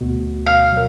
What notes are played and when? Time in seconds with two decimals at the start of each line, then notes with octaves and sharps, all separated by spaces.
0.01 D2 B2
0.47 F5
0.73 F#3 A#4